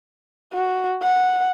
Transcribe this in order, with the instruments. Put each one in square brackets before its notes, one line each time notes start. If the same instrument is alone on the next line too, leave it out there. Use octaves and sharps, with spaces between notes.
[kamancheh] F#4
F#5